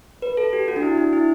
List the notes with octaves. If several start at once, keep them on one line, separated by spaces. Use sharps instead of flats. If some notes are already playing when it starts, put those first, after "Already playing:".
B4
A4
G4
F#4
D4
E4
D4
E4